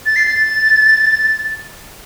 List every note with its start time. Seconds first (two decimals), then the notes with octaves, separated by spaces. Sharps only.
0.06 A6
0.16 C7
0.26 A6